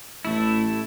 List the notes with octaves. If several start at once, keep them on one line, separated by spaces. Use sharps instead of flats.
A1 A3 E4